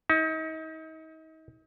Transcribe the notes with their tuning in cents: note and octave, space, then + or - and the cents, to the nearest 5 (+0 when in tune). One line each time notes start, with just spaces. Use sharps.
D#4 +35